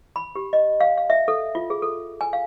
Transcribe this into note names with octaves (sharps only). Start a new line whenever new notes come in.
B5
G4
D#5
F5
F5
E5
A4
F4
G#4
A4
G#5
F5